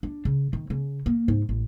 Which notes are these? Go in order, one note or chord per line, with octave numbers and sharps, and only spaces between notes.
D4
C#3
D#3
C#3
A#3
G#2
A1